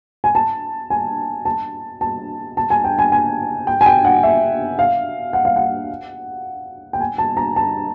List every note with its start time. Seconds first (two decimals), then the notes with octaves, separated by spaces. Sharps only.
0.24 G#5
0.35 A5
0.90 G#5
1.45 A5
2.01 A5
2.57 A5
2.70 G#5
2.84 G5
2.98 G#5
3.12 G#5
3.67 G5
3.81 G#5
3.86 G5
4.05 F#5
4.23 E5
4.79 F5
5.33 F#5
5.45 F5
5.56 F#5
6.93 G5
7.01 G#5
7.18 A5
7.37 A#5
7.56 A5